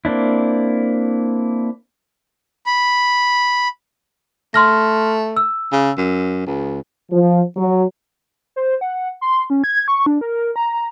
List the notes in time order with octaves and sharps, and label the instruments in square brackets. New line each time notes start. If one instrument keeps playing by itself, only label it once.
[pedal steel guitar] A#3 C4 D4 E4
[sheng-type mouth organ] B5
[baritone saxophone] A3 [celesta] C6 F6 A#6
[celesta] E6
[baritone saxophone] C#3
F#2
C#2
[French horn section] F3
F#3
[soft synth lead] C5
F#5
C6
C#4
G#6
C#6
D4
A#4
A#5